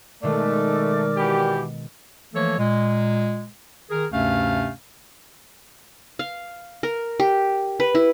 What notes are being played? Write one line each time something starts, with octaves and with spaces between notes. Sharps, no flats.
B2 D#3 G#3 A3 A#4 D5 D6
E3 F#4 G4
E3 F3 A3 A#3 A4 C#5
A#2 G#3
D#3 G#4 A#4
D2 G2 C3 A3 C#4 F5
F5
A#4
G4
B4
E4